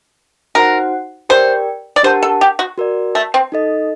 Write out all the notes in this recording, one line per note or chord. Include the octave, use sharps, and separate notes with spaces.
D#4 F#4 A#4 C5 F#5
G4 A#4 C5 D5 G5
D5
D4 G4 A#4 C5 F#5 A5
A4
G4
F#4
F#4 A#4 D5
A3
C4
D#4 A4 D#5